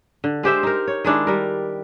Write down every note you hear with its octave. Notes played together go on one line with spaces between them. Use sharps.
D3
G#3 G4 C5 E5
D#4 A#4
C#5
D#3 G#3 D4 E4
G3 A#4